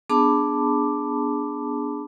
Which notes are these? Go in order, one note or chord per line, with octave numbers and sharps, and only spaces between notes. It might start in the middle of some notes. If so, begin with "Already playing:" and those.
B3 D4 G#4 A5 B5 D6